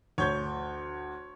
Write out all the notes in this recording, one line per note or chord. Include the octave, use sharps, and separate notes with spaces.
D2 C#5 G6 G#6